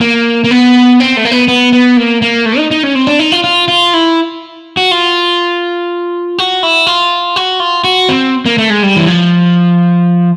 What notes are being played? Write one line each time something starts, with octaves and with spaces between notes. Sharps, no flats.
A#3
A#3
B3
C4
A3
A#3
B3
B3
B3
A#3
A#3
A3
D#4
D#4
C#4
C4
D4
D#4
F4
F4
F4
E4
F#4
F4
F#4
E4
F4
F#4
F4
F#4
C4
A#3
A3
G#3
G3
E3
F3